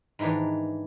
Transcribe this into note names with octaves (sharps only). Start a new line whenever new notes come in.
G#2 D#3 E3 D4 C#5